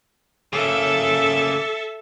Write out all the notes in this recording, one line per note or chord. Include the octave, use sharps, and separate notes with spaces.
C#3 A#3 A4 E5